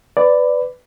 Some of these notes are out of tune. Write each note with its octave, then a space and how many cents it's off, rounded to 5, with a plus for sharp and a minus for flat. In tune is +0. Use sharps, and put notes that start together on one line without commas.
B4 +15 D5 +0